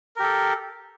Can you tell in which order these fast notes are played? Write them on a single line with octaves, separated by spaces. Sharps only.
A#4 G4 A4